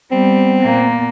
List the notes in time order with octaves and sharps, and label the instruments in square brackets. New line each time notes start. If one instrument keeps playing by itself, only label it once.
[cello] G3 [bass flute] B3 [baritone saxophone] C4
[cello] A#2 A#3